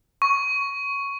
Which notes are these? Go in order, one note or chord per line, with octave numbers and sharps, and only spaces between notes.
C#6